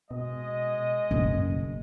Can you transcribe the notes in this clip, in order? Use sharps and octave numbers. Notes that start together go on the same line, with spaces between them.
B2 G#3 D#5
F#1 B2